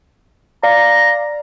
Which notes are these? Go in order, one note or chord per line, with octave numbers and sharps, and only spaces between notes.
D5 F5 A#5